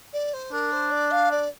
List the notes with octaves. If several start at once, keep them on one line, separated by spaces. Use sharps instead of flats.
D5
C5
D4 A#4
C5
D5
F5
D5